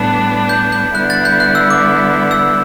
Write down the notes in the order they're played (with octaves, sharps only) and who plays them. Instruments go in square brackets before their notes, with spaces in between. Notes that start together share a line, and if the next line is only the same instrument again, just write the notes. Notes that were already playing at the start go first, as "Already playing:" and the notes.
Already playing: [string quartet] A2 G3 B3 D4
[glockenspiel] G6
G6
[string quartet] D3 G3 B3 E4 [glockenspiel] F#6
[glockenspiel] F#6 A6
G6
F#6
E6
D6
E6